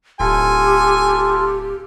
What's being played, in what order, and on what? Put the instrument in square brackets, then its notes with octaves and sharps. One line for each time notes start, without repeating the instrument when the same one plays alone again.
[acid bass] D1 [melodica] F4 A4 [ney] G4 [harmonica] G#5